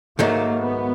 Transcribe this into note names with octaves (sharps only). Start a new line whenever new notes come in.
G#2 D#3 F#3 A3 A#3
B3